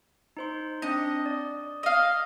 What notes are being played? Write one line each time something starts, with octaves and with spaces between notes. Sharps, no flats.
D#4 C5 C6
C4 D4 D#5 A#6
D5
D#5 F5